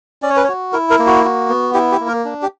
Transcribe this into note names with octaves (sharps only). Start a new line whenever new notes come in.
C#4 D5
C#5
B4
C#5
F#4
E4 A#4
A#4
A#3
F#4
F#4
B3
E4 G4
G4
A#3
A#4
D4
G4